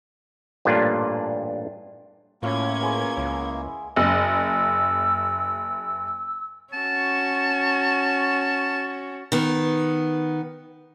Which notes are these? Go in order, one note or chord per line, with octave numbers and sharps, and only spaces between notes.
A1 G2 A#2 D4 F4
A2 A#3 C#4 E4 F4 A#4 C5 G#6
B3 G#4 C6
C#2 E4
F#1 E6
C#4 F#4 A5
D#3 B3